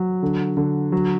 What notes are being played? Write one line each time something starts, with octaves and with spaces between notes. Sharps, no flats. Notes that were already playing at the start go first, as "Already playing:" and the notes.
Already playing: F#3
D3
D3
F#3